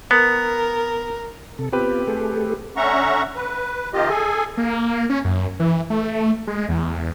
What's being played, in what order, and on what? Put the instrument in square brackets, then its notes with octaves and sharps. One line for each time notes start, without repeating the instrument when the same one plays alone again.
[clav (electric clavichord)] B3 [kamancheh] A#4
[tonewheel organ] C3 A4
[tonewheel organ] B3 F4 [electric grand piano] C4 G4 B4
[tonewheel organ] A3 G#4 A4
[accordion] D3 C#4 E5 F#5 A#5 C#6
B4
C3 D#3 F4 G4 D#5
G#4 A4 G#5
[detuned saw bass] A#3
C#4
F#2
E3
A3
G#3
E2